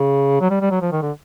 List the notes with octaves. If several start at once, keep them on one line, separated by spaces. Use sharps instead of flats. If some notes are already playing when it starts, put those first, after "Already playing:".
Already playing: C#3
F#3
G3
G3
F#3
F3
D#3
D3